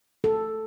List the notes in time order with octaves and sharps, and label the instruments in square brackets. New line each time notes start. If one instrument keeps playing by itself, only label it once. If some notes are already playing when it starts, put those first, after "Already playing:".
[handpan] A4